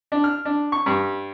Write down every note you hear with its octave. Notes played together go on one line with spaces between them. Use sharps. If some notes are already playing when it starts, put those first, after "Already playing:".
D4
F6
D4
C#6
G2